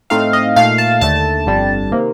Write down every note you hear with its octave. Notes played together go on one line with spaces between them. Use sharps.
A2 A3 C4 D#4 F5
D#5
A#2 A3 D#4 F5
A5
D#2 D3 A3 A5
G1 F2 D3 G3 D4
C3 D#3 A#3